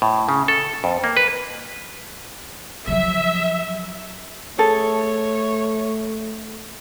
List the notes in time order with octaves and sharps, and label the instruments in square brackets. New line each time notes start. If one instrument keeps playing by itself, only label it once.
[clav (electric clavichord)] A2
C#3
A4
F2
A#3
B4
[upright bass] F3 F#3 [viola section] E5
[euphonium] A3 [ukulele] G#4 A4 [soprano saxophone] C#5